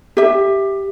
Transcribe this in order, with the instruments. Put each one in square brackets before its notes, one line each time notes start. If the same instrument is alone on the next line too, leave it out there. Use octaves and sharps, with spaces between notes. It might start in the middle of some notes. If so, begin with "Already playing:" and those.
[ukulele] G4 E5